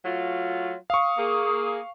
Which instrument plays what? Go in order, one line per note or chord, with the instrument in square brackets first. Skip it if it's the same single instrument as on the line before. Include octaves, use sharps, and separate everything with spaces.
[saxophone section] F#3 A3 F4
[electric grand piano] F5 C#6 [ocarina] D#6
[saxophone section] A#3 G#4